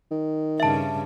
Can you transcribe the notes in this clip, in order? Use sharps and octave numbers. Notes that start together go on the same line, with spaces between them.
D#3
G2 C#3 E5 A5